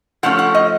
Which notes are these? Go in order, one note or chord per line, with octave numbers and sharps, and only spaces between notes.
F3 A3 C#4 F#5
F#5
D#5